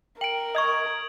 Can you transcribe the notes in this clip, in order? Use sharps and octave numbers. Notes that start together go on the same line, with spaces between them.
A#4 G5 D7 F#7
D#5 C#6 D#6 G#6